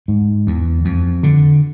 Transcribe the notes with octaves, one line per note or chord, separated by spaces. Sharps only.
G#2
E2
F2
D3